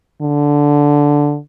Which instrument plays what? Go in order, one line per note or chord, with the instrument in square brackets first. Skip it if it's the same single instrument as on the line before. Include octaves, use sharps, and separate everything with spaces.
[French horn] D3